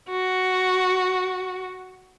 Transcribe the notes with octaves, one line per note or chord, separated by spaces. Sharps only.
F#4